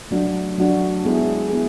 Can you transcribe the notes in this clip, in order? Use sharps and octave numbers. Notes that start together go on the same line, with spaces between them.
F#3 A3 D4 F#4
F#3 A3 D4 F#4
G#3 B3 E4 G#4
B3 E4 G#4